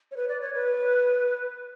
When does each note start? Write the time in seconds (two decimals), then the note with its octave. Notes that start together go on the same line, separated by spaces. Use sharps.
0.11 C#5
0.16 B4
0.29 D5
0.41 C#5
0.54 B4